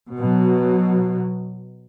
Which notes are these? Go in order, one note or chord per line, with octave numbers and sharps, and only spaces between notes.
B2 F#3